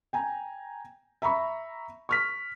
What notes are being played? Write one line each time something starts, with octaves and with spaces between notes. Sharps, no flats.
G5 G#5 A#5
E5 A#5 B5 C#6
C#6 F6 B6